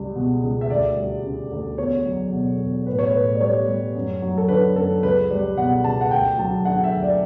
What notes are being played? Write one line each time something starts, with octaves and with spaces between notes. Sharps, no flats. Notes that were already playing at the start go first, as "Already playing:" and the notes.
Already playing: C#2 G3
B2
C#2
E5
D2 D5
G3
C#3
D2
E2 C#5
F#3
B2
E2
A2 B4
C#5
A2 B4
D5
G3 C#5
G3
F#2
F#3
A4
D3 B4
F#2 A4
C#2 B4
G3
B2 F#5
C#2 A5
F#5
D2 G5
F#3 A5
D3 F#5
E5
D2
D5